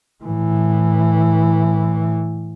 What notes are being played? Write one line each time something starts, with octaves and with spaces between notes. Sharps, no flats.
A2 E3